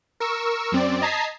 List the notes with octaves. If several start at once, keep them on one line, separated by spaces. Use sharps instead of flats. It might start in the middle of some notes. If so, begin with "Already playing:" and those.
A#4 C#6 E6
F#2 C4 D5
D#5 A5 A#5 G#6 B6 C7